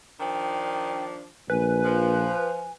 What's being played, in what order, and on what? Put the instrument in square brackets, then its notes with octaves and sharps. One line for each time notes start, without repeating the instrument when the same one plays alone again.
[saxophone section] D#3 F3 D4 [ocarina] G5
[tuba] A#1 [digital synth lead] B4 [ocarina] G#5
[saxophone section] F3